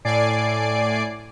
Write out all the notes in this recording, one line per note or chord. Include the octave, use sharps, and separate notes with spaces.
A2 D5 G#5 C7 D7